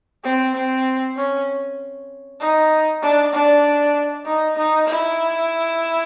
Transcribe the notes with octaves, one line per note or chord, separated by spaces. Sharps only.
C4
C4
C#4
D#4
D4
D4
D#4
D#4
E4